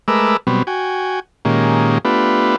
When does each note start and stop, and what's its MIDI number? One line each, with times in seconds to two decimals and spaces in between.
0.08 0.37 56
0.08 0.37 57
0.08 0.37 70
0.08 0.37 71
0.08 0.37 86
0.08 0.37 88
0.47 0.63 47
0.47 0.63 54
0.47 0.63 55
0.47 0.63 59
0.47 0.63 60
0.67 1.20 66
0.67 1.20 79
0.67 1.20 80
1.45 1.98 46
1.45 1.98 51
1.45 1.98 56
1.45 1.98 58
1.45 1.98 61
1.45 1.98 67
2.05 2.56 57
2.05 2.56 59
2.05 2.56 62
2.05 2.56 65
2.05 2.56 67
2.05 2.56 71